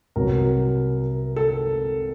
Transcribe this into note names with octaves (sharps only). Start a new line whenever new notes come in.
C2 B2 F#3 A#4
A4